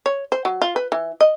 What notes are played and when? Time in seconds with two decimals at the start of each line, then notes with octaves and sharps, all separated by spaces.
0.06 C#5
0.32 C5
0.45 F#3
0.62 F4
0.76 B4
0.92 E3
1.21 D#5